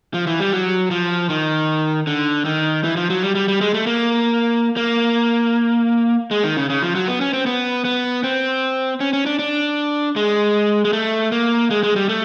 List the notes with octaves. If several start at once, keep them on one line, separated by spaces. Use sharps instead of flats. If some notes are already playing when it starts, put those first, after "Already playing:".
F3
E3
G3
F#3
F3
D#3
D3
D#3
E3
F3
F#3
G3
G3
G3
G#3
A3
A#3
A#3
G#3
D#3
C#3
C#3
F3
F#3
B3
C#4
C4
B3
B3
C4
C#4
C#4
D4
D4
G#3
G#3
A3
A#3
G#3
G#3
G3
A3